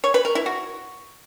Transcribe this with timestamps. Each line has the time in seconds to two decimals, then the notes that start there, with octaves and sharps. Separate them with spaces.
0.04 C#5
0.14 B4
0.25 A#4
0.35 E4
0.46 F#4